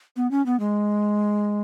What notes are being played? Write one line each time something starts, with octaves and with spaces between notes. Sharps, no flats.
B3
C#4
B3
G#3